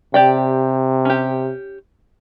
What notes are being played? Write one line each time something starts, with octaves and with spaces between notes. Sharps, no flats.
C3 G4 D5 G5
C#4 G4